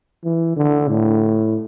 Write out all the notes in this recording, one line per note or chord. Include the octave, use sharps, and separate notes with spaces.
E3
D3
A2